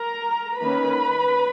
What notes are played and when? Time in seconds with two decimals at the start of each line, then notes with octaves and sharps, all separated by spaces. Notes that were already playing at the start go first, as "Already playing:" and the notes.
Already playing: A#4 A#5
0.60 D#3 A#3 C#4 B4 B5